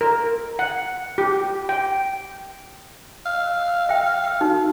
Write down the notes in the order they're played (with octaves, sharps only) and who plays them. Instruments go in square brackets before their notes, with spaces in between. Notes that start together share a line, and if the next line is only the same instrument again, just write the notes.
[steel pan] A#4
F#5
G4
G5
[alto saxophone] F5
[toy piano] E5 G5
E6
D#4 F#4